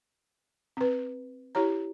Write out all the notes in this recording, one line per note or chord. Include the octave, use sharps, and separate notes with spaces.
C4 B4
E4 G4 C#5 A#5